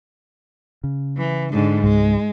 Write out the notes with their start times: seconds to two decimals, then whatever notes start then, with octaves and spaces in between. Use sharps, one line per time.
0.84 C#3
1.17 E3
1.52 G#2 D3
1.84 C#2 G#2 G#3